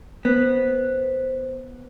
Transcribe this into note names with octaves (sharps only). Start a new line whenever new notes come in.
B3 C5